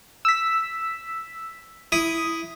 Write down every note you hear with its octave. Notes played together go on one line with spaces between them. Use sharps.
E6 B6
E4 D#6